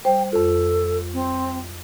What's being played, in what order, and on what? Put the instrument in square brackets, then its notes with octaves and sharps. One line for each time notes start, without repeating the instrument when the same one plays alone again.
[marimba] G3 C5 [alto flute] G5
[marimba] F2 F4 [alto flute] A4
[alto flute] C4